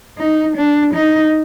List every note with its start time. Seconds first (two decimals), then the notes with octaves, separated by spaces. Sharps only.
0.18 D#4
0.56 D4
0.94 D#4